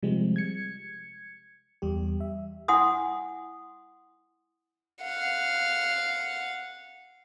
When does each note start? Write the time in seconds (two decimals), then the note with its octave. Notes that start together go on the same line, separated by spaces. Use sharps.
0.03 C3 F3 G3 G#3 C4
0.36 G#6 C#7
1.82 E2 G3 G4
2.20 E5
2.68 E4 F#5 G#5 C6 D#6
5.01 F5 F#5